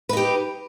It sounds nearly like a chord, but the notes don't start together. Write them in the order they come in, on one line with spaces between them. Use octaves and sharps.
B4 D#4 G4